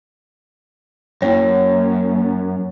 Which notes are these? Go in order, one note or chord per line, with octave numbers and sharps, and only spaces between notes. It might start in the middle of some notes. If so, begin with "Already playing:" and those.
F#2 A#3 C#5